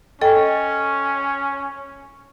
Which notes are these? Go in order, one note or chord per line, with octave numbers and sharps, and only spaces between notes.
C#4 A4 D#5 G5